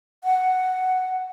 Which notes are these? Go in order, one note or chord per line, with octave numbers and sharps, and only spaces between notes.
F#5